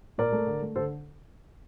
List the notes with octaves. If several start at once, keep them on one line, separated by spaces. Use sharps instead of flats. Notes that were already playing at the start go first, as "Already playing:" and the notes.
A#2 A#4 D5
A3
D3
A3
D3 A4 C5